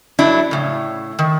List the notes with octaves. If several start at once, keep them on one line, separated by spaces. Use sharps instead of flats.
F2 F#3 D4 E4
A2 C#3
D#3